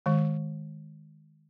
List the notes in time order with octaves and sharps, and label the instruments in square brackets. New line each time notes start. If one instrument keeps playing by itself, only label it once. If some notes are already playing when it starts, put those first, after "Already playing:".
[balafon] D#3 G#3